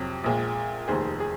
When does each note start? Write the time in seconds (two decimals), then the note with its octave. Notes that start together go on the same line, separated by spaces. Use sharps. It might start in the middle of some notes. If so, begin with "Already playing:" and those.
Already playing: F2 C3 F#3
0.24 A#1 A#2 G#3
0.88 F1 D#2 D#3 G#4 C5
1.20 G#4